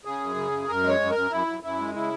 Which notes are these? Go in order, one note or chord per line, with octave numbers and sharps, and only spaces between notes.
C#3 G#4
F#2
C#3
F#2
F#2 A#4
G#3
C#5
F#2
F#2 A#4
F#2 E4
F#2
F#2 E4
G#3
C#3 E4